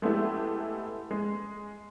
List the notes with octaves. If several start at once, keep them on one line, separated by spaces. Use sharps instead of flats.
G#3 A3 B3 E4 G4
G#3